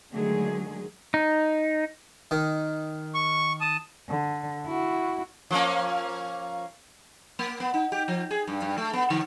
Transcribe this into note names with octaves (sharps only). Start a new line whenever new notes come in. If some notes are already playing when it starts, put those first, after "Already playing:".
D3 D#3 F#3 G#3 A3 G#4
D#4
D#3
C#6
A5 D#6
D3
E4 F#4
F3 A#3 C#4
A#3
B3
D#4
G4
F3
G#4
G2
G2
A3
B3
D3